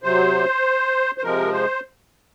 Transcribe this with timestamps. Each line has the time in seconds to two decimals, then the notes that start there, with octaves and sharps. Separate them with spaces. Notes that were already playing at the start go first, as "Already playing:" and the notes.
0.03 C3 F#3 C5
1.18 C5
1.23 C3 F3 G#3 A#4
1.53 C5